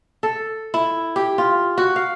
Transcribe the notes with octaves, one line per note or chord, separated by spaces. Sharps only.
A4
E4
G4
F4
F#4
F5